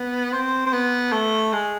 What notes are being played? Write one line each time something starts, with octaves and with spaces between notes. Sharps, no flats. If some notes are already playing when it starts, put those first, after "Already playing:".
Already playing: B3
C4
C4
B3
A3
G#3